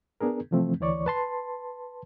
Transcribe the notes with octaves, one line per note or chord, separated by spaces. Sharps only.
B3 D4 G#4 A#4
C3 E3 F3 A3 C4
D2 E3 C#5 D5 C#6
B4 A5 C6